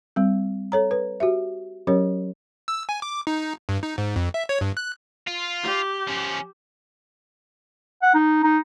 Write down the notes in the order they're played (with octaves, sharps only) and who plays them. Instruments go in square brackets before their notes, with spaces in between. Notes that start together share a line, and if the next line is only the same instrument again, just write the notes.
[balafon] G3 C4
A4 C#5 A#5
B4
F#4 G4 E5
F#3 C#4 G4 A#4 C#5
[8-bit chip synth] E6
G#5
D6
D#4
G2
D#4
G#2
F2
E5
C#5
G2
F#6
[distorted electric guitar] F4
[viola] G4
[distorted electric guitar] F3 C#4
[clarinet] F#5
D#4
D#4